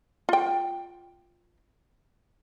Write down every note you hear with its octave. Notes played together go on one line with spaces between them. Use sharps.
F4 G5